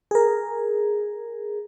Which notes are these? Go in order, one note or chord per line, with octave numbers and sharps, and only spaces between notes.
G#4 A#4